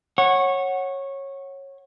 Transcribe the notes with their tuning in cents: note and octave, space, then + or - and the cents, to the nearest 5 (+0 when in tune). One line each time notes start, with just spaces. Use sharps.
C#5 -15 F#5 +0